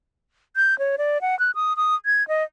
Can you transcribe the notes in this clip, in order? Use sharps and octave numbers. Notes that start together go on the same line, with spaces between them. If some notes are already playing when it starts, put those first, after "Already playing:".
G6
C#5
D5
F#5
F#6
D#6
D#6
G#6
D#5